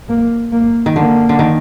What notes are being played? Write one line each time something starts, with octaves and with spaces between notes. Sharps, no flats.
A#3
A#3
D#3
D3 A#3
D3
D#3